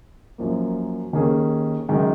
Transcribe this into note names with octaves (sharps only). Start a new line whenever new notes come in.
F#2 F3 A#3
D#2 D#3 A#3 C#4 G#4
F#2 D#3 G#3